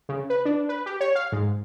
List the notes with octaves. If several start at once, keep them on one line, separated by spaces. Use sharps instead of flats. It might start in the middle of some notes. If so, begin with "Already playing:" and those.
C#3
B4
D4
B4
G4
C#5
F5
G#2